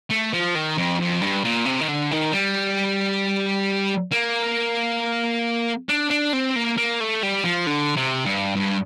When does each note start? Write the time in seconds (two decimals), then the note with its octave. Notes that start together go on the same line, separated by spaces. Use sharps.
0.10 A3
0.33 F3
0.55 D#3
0.78 F2
1.00 F2
1.21 G2
1.44 A#2
1.66 C3
1.81 D#3
1.88 D3
2.11 D#3
2.32 G3
4.11 A#3
5.89 D4
6.11 D4
6.33 C4
6.56 A#3
6.78 A#3
7.01 A3
7.23 G3
7.44 F3
7.67 D3
7.96 C3
8.26 G2
8.56 G2